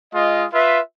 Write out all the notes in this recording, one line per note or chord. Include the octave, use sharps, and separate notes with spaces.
G#3 F4 D#5
F4 B4 E5